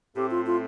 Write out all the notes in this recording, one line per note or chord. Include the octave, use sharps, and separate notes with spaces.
A2 A3 C4 G4
F4
F4